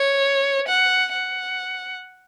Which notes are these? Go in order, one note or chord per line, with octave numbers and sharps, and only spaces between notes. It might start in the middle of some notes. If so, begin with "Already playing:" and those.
Already playing: C#5
F#5
F#5